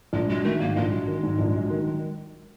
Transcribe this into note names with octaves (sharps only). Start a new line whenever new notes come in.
A#1 G#3
F#3 G#3
D#3 A3
G#2 A#3
A#1 G#3
F#3
D#3
G#2
A#1
F#3
D#3